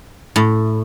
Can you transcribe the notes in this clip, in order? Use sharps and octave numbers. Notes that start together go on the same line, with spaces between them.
A2